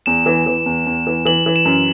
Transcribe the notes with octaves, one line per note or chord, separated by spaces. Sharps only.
E2 E7
E3
E3
E2
E2
E3
E3 F#7
E3
E7
F#2